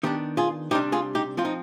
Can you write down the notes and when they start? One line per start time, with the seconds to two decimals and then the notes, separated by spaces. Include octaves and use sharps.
0.03 D#3 B3 D4 D#4 G4
0.37 F4 G#4
0.71 C3 G3 D4 D#4 G4
0.92 F4 G#4
1.15 D#4 G4
1.37 F3 C4 F4
1.45 D#4